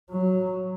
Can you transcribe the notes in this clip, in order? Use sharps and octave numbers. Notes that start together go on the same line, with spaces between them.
F#3